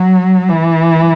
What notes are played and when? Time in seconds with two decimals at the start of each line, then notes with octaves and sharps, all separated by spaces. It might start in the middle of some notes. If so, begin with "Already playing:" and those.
Already playing: F#3
0.49 E3